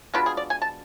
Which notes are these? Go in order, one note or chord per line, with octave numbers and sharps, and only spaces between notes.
B2 G#3 D4 F4 B4
G#4
D5
G#5
A5